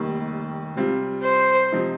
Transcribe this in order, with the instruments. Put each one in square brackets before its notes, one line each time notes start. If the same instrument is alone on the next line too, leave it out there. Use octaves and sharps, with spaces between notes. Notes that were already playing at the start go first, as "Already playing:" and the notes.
Already playing: [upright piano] F1 D#2 D#3 G3
C3 G3 C4 F4
[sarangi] C5
[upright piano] C3 F3 C4 D#4